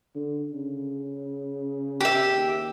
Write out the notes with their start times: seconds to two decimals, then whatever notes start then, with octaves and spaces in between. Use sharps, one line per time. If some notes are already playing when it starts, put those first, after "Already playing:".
0.15 D3
0.53 C#3
2.01 G4 E5
2.34 D#2